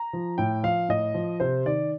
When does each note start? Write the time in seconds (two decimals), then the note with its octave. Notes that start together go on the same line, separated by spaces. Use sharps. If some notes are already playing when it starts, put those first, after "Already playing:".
Already playing: A#5
0.13 F3
0.38 A2 G5
0.63 F3 F5
0.89 A2 D#5
1.14 F3
1.40 C3 C5
1.65 D#3 D5